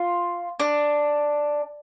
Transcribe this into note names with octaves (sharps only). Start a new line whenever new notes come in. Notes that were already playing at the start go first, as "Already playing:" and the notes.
Already playing: F4
D4